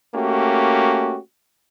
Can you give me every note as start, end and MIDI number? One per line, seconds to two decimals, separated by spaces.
0.15 1.18 57
0.15 1.18 58
0.15 1.18 61
0.15 1.18 66
0.15 1.18 67